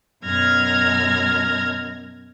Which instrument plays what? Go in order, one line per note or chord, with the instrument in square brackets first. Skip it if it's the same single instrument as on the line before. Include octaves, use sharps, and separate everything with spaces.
[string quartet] F#2 B2 F6 G#6 A#6